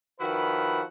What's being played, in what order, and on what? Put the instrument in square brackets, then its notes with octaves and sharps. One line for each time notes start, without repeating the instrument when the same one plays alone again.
[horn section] D#3 F3 E4 F#4 B4 B5